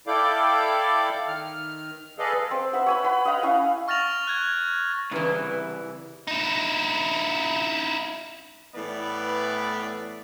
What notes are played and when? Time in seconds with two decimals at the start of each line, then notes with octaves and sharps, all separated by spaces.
0.07 E4 A4 D5 F5 G5 D6
1.27 D#3 F6
2.18 G#4 A4 B4 D5 D#5 F5
2.51 C4
2.73 B4 E5 F#5
2.86 C#5 G#5 B5
3.04 F#5 B5
3.25 D#5 F5 F#5 A#5
3.43 C#4 E4 F5 G#5
3.88 C#6 F6 A6 A#6 F7 F#7
4.27 F#6 G#6
5.12 C2 C#3 E3 B4
6.28 D#4 E4
8.75 A2 E3 B3 B4 D5